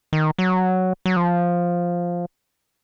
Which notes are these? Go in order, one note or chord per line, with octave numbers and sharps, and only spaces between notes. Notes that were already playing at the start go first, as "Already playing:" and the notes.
D#3
F#3
F#3
F3